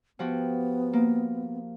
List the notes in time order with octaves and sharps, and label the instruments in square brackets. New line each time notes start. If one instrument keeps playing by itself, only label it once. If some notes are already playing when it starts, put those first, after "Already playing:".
[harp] F3 F#4 G4 [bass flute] B3
[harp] A#3